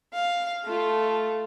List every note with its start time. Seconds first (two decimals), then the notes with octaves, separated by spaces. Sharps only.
0.14 F5
0.64 A3 F4